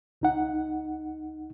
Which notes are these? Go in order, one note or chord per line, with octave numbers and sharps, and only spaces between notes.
C#2 D#4 F#5